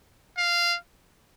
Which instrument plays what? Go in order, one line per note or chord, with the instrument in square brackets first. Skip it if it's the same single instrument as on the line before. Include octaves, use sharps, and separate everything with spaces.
[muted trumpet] F5